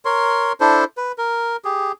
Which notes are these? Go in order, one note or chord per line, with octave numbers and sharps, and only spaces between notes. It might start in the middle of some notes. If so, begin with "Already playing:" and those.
A#4 C#5 C6
D4 E4 A4 C5
B4
A#4
G4 G#4